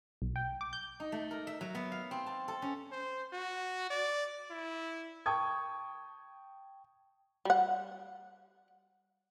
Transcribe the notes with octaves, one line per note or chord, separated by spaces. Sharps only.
B1
G5
D6
G6
D#4
A3
A#4
E5
F#3
B3
F5
C4
A5
A4
C#4
C5
F#4
D5
E4
G5 A5 C#6 D#6 G#6
G3 F#5